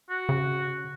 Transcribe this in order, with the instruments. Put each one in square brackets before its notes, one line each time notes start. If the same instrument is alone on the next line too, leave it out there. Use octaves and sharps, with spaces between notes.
[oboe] F#4
[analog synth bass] C#3